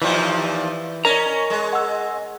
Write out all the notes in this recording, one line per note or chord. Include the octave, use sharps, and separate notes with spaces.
D#2 A#2 E3 F3
C#4 A#4 C#5 D#5 A#5
G#3
F#5 E6